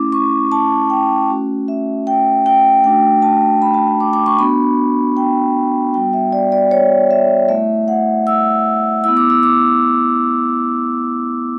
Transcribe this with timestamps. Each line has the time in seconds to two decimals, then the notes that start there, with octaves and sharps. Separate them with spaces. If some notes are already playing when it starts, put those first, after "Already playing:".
Already playing: A3 C#4 E4 D6
0.12 C#6
0.52 A5
0.90 G5
1.29 A3 C#4 F#4
1.68 E5
2.07 G5
2.46 G5
2.84 A3 D4 F#4 G5
3.22 A5
3.62 B5
3.74 A5
3.88 G5
4.00 D6
4.13 D6
4.26 C#6
4.39 B3 D4 F#4 B5
5.17 G5
5.94 G3 B3 F#4 G5
6.13 E5
6.33 D5
6.52 D5
6.71 C#5
7.11 E5
7.49 A3 E4 E5
7.88 F#5
8.27 E6
9.04 B3 E4 E6
9.17 D6
9.30 E6
9.43 D6